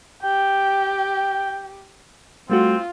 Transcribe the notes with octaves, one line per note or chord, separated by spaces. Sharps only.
G4 G5
G3 A3 C4 F4 F#4